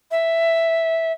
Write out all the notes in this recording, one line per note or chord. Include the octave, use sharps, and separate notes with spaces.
E5